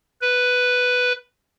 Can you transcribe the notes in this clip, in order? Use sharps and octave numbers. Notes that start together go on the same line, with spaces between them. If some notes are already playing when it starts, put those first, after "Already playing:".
B4